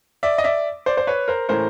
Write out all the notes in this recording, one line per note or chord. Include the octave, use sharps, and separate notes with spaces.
D5 E5
D#5
D5 E5
C5 D5
C5
B4 C#5
A#4 C5
A2 E3 A3 C#4 A#4 C5